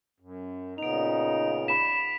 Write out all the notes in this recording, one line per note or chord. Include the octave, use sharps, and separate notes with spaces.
F#2
A#2 C#3 B3 D#4 D7 F7
B5 B6 E7